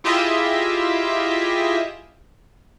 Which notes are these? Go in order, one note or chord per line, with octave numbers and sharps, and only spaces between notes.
E4 F4 G4 G#4 D#5 E5